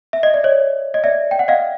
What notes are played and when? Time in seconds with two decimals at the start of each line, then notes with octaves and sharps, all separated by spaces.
0.13 E5
0.23 D#5
0.34 D5
0.44 C#5 D#5
0.94 D#5
1.04 D5 E5
1.31 G5
1.39 F#5
1.48 D#5 F5